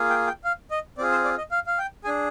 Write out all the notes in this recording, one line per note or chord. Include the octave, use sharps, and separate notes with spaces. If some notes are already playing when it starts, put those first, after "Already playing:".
Already playing: A#3 F4 G#4
G5
G5
F5
D#5
C4 F4 G#4 D5
C5
D5
D#5
F5
F5
G5
D4 G#4 G#5